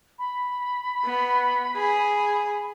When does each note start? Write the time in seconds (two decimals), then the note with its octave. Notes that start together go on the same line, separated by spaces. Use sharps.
0.19 B5
1.05 B3
1.76 G#4